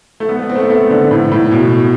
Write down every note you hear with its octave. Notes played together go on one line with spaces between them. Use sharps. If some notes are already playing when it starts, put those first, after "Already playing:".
A3
B3
B3
C4
A3
B3
A3
D3
A2
A2
B2